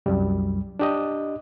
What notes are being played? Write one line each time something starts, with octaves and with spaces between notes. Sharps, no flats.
C2 F#2 G3
D4 G4 D#5